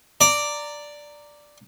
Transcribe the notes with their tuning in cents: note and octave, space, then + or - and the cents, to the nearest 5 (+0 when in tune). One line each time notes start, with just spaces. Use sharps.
D5 +0 A#5 -15